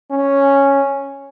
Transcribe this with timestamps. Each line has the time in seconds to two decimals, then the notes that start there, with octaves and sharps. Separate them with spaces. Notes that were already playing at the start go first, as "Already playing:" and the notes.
0.11 C#4